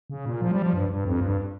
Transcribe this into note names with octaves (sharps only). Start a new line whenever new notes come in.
C#3
A#2
F3
G3
F3
G2
G2
F2
G2